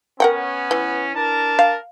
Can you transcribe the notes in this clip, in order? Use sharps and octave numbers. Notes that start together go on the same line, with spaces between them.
B3 C#4 A#4 F#5 G5
E3
D4 A#4 A5
F5